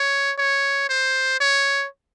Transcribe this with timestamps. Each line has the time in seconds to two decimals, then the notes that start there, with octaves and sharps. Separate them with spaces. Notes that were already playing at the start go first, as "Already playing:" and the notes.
Already playing: C#5
0.38 C#5
0.89 C5
1.40 C#5